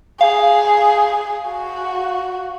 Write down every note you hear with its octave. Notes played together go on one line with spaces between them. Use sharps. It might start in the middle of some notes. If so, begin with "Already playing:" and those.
G#4 F5
F#4